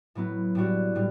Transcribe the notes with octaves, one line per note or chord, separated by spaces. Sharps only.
A2 F#3 B3 E4
A2 G3 D4 F#4
A2 G3